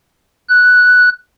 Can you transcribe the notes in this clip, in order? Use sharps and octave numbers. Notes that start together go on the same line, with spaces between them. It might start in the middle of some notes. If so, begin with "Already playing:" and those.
F#6